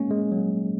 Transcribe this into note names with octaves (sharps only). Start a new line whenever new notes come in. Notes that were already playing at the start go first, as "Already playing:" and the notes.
Already playing: G#3 A#3 C#4
G#3
F#3